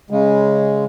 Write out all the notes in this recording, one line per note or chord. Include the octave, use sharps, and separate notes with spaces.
C#3 G#3